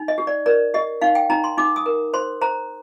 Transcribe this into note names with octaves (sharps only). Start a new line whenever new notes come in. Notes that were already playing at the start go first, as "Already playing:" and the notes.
Already playing: D#4
D#5
G4
D5
A#4 D5
G4 D#5
D#4 F5
G5
D#4 A#5
C6
D#4 D6
D#6
A#4
C5 C6
C5 A#5